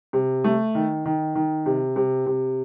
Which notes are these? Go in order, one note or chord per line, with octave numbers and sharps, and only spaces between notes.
C3
A3
D#3
D#3
D#3
C3
C3
C3